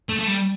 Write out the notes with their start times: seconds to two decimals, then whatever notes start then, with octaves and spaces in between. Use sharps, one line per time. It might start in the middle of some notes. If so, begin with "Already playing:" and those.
0.09 A3
0.19 A3
0.27 G3